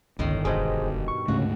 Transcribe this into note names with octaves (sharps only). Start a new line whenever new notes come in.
G1 C#2 A2 D#3 C6
E1 G2 B2 G#4 C5 D#5
C#6
D2 G#2 C#3 A3 F#4